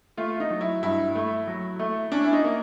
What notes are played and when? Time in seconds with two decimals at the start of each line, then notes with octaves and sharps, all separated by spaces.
0.17 A3 F4
0.40 D#4
0.50 F#3
0.61 E4
0.83 G2 E4
1.15 A3
1.47 F#3
1.79 A3
2.12 C#4 D4
2.24 E4
2.33 D#4
2.44 A#3